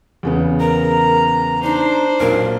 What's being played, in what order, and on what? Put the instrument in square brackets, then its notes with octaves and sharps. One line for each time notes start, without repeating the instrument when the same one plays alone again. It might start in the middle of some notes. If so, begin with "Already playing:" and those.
[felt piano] E2 C#3 B3
[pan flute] A#4 [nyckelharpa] A#5
[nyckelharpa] D4 C5 [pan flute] D#4
[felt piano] B1 A#2 [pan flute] A#4